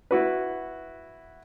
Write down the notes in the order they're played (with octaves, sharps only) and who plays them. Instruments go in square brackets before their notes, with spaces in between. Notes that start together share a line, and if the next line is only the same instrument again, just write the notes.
[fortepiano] E4 F#4 B4